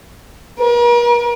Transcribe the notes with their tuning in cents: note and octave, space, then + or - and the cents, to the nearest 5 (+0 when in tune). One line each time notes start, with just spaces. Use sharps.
A#4 +45